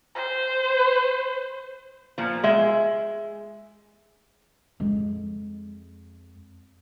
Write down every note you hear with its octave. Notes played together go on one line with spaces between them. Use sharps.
C5
A#2 F3
G#3 E5
F2 G#3